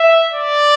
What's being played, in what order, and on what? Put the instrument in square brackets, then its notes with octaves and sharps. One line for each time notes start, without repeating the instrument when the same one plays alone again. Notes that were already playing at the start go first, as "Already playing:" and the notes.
Already playing: [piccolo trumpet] E5
D5